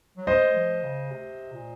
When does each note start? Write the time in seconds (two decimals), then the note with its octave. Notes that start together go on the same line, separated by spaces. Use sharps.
0.17 F#3
0.27 G#3 C5 D#5
0.55 F3
0.83 C#3
1.11 C3
1.53 A#2